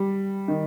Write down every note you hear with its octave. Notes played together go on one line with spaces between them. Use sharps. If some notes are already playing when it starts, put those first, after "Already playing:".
Already playing: G3
D#3